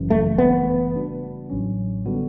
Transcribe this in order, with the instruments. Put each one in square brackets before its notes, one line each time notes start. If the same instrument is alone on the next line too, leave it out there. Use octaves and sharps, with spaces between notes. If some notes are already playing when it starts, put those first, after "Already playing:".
Already playing: [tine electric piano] G1 F#2 C#3 E3
[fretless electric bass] A3
[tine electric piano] G1 G2 E3 A3 [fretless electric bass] B3
[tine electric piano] C#3 G3 D4 F#4
A1 A2 F#3 C#4
D3 G3 B3 F#4